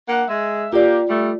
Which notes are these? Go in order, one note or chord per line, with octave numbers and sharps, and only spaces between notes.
A#3 D4 F#5
G#3 E5
A#3 F4 G4 D5
G3 A3